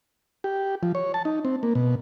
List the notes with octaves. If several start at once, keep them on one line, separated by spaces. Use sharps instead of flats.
G4
F3
C#5
A5
D#4
C4
A#3
B2